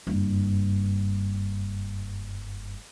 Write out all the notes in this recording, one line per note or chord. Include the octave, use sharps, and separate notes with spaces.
F#1 G2